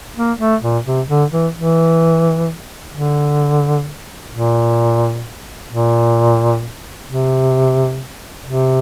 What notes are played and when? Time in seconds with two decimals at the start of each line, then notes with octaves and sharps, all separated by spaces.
0.16 A#3
0.39 A3
0.62 A#2
0.85 C3
1.08 D3
1.31 E3
1.54 E3
2.92 D3
4.31 A#2
5.69 A#2
7.06 C3
8.45 C3